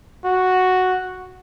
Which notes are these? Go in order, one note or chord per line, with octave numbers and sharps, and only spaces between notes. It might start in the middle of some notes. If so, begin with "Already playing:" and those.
F#4